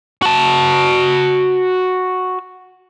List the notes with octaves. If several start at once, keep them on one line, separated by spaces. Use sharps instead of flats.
F#4 A5